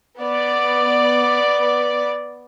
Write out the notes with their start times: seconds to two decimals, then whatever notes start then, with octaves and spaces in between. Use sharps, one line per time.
0.19 B3 D5